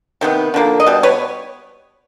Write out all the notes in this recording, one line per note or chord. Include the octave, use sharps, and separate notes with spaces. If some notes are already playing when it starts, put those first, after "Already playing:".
C3 D#3 B3
D3 F3 A#3
D#5
B2 G3
B4 C#5